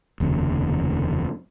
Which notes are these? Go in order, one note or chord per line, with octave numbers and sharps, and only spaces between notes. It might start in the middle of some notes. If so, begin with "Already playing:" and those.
F1 D#2 C#3